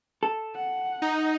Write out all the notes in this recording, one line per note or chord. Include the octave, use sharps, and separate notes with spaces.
A4
F#5
D#4